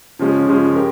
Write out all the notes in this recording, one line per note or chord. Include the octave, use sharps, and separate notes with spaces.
C#3 F3 G#3 C#4
C#3 F3 G#3 C#4
G4 A#4